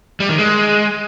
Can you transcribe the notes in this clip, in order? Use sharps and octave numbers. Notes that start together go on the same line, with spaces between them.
G3
D#3
G#3